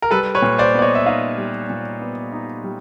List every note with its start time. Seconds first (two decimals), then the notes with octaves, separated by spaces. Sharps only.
0.02 A#4
0.11 G3 A4 B4
0.35 B4 C#5
0.42 A#2
0.58 C5 D5
0.74 B3 D5
0.82 C#5 D#5
0.95 E5
1.06 D#4 D#5 F5
1.37 G3
1.70 A#2
2.01 B3
2.32 D#4
2.64 G3